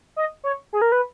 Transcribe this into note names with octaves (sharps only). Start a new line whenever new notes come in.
D#5
C#5
G#4
A#4
B4